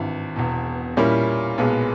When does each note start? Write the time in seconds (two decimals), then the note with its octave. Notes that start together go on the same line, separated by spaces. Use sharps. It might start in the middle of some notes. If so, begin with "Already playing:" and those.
Already playing: G#1 G2 E3
0.36 E1 E2 B2
0.97 A#2 G3 C#4 E4 A#4
1.58 B1 A#2 G#3 B3